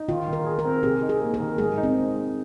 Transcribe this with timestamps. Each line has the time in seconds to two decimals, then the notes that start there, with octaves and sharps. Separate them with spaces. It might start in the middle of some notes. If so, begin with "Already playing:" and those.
Already playing: D#4
0.08 D#3 F4
0.28 D#3
0.33 A#4
0.46 G#4
0.59 A#4
0.65 C4
0.83 C3 G#4
1.02 D#4
1.09 G#4
1.21 A#3
1.34 A#4
1.40 D#3
1.58 G#2 G#4
1.78 D#4
1.83 C4